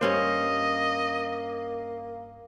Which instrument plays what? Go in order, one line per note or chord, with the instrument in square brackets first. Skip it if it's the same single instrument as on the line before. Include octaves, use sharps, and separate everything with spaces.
[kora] G2 C#4 C5 [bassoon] A#3 [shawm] D#5